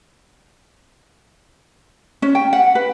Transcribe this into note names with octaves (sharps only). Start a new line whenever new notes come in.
C#4
G5
F#5
B4